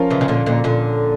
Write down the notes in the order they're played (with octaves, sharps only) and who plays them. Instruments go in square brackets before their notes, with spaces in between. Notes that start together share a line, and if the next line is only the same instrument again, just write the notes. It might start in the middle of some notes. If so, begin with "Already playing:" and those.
Already playing: [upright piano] F3 C#4 F4 A#4
[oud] C#3 E3
C#3
A#2 D3
A#2 D3
A#2 D3